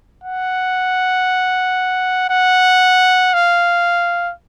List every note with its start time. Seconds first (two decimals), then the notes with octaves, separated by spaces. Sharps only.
0.24 F#5
2.30 F#5
3.33 F5